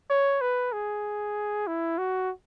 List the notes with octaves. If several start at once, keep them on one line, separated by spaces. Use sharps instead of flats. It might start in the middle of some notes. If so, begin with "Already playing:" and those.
C#5
B4
G#4
E4
F#4